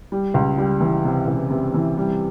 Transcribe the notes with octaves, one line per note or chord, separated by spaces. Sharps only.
G3
C#2
G3
E3
C3
C#2
C3
E3
G3